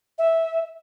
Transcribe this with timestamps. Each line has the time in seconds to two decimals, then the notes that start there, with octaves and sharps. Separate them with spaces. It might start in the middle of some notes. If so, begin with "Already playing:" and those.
0.18 E5